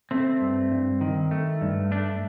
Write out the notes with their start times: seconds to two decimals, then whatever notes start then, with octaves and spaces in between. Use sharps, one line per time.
0.11 A3 C4
0.41 G2
0.71 G2
1.01 D#3
1.31 A3
1.61 G2
1.91 A3 D4